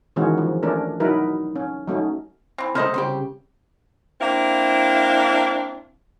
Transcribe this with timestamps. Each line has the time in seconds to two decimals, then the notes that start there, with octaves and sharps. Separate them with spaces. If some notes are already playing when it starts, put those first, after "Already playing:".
0.16 D#3 E3 G#3 C#4 F#4
0.38 F3
0.63 A3 C#4 D4 A#4
1.00 F#3 D#4 E4 A#4 B4
1.56 C#4
1.88 F#3 A3 C#4 D#4
2.58 E3 C4
2.75 C3 A3 A#4 C5 D#5
2.94 C2 C#3 G4 C5
4.21 A#3 C4 D4 E4 F5